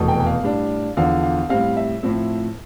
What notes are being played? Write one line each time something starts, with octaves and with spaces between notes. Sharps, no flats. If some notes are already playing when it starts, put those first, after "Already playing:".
Already playing: F1 E2 B2 A3
G5
G5
F5
A2 G3 D4
E2 D3 F3 F5
F5
A2 G3 C4 F5
E5
A2 F3 C4